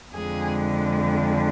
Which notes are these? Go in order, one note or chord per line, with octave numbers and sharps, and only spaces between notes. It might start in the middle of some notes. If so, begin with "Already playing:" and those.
F2 D3 G#3 G#4